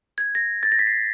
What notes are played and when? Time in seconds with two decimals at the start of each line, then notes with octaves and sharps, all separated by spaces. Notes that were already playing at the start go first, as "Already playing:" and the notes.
0.18 G#6
0.35 A#6
0.63 A6
0.72 A#6
0.79 B6
0.87 C7